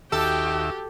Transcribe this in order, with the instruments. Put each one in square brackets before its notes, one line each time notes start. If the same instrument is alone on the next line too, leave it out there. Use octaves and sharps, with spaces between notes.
[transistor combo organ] D#2 E5 [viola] F#4 G5 [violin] G4 [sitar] A4